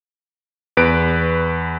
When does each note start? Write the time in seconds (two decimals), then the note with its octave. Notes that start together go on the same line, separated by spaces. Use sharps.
0.77 E2 B4 D7